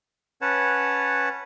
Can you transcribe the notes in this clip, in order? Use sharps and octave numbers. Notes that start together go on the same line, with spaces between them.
C#4 B4 C#5 F#5 A5